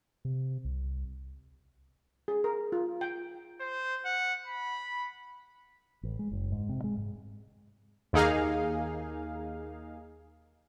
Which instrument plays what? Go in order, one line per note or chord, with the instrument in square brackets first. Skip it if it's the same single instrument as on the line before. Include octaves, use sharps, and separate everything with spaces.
[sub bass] C3
C2
[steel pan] G#4
A#4
F4
G5
[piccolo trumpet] C5
F#5
B5
[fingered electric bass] A1
G#3
F#1
G#2
C3
G#3
G#2
[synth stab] D#2 A#3 D#4 G#4 F5